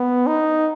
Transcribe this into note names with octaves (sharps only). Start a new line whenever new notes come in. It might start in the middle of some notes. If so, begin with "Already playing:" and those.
Already playing: B3
D#4